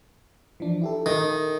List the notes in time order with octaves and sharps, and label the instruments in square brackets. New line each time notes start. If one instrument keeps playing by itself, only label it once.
[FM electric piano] E3 F3 D4
E4 G4 A4
[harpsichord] D#3